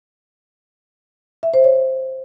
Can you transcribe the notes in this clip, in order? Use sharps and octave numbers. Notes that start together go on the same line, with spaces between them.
E5
C5
C#5